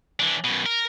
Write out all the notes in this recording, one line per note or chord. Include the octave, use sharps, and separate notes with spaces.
E3 D4
F#2 B2
A#4